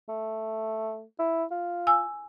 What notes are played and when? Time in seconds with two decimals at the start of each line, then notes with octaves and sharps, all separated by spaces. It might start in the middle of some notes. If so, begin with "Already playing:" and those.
0.09 A3
1.19 E4
1.51 F4
1.87 G#5 E6